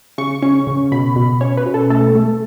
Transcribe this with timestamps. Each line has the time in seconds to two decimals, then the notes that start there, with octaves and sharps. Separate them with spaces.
0.18 C#3 C#6
0.42 C#4 C#6
0.67 C#3
0.92 B2 B5
1.16 B2
1.41 C#4 C#5
1.57 B4
1.66 B2
1.74 A4
1.90 A3 A4
2.15 A3